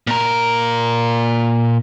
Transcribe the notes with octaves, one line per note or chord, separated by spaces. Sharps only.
A#2 A#4